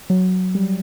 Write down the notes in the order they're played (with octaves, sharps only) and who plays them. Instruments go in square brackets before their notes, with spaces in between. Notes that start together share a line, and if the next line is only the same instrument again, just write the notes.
[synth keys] F#3
G3